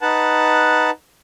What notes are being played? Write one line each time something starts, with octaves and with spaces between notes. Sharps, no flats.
D#4 B4 F#5 A5